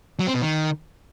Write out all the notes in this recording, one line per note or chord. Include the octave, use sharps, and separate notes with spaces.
F#3
C4
B2
D#3